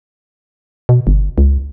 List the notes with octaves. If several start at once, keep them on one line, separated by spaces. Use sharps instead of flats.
B2
G1
C#2